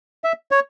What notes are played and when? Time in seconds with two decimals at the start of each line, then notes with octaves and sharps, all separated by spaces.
0.24 E5
0.51 C#5